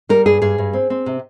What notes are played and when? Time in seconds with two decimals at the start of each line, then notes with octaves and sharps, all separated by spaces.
0.09 G3 A#4
0.26 G2 G#4
0.41 G2 G#4
0.58 G2
0.73 C4
0.90 C4
1.06 C3